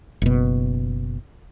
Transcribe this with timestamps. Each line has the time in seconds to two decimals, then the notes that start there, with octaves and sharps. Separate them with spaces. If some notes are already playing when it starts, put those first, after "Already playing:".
0.22 F#1 B2